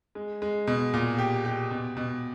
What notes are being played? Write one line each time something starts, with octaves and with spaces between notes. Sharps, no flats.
G#3
G#3
B2
A#2
G4
G4
B2
B2